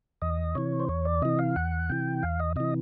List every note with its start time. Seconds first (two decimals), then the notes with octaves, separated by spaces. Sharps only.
0.22 E2 D#5
0.55 C3 E3 C#5
0.80 C5
0.88 E2 C#5
1.05 D5
1.22 C3 E3 D#5
1.39 F5
1.56 E2 F#5
1.89 C3 E3 G5
2.23 E2 F5
2.40 D#5
2.56 C3 E3 D#5